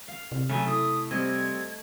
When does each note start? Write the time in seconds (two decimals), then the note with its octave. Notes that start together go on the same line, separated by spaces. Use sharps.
0.08 F5
0.32 C3
0.49 C#3 F#3 A3 G#5
0.67 E4 D#6
1.11 G3 C4 D#5 G#6